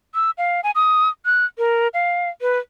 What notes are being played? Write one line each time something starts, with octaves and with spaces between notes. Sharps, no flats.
E6
F5
G#5
D#6
F#6
A#4
F5
B4